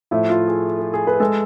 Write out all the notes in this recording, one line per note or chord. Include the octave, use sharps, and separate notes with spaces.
A2 F3 A3 E4
F4
G#4
G#4
G#4
B4
G#3 A4